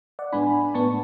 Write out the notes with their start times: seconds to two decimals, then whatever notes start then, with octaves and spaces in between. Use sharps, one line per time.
0.19 D5 F#5
0.32 A2 G#3 B3 D4 G#5 B5
0.74 A2 G#3 B3 D4 A5 C#6